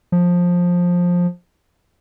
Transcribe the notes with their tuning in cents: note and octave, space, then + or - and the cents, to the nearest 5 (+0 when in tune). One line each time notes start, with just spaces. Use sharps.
F3 +15